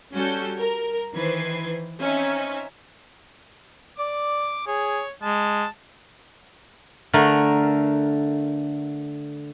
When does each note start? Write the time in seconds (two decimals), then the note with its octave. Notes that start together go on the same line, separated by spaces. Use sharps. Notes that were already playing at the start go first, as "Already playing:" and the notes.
0.14 G3 C#4 F#4 A4 G6
0.58 A#4
1.14 D#3 E3 B4 C5 G#6 C7
2.00 C4 C#4 D#4 E5
3.99 D5 D6
4.67 G#4 C#5
5.23 G#3 A5
7.14 D3 A3 A#4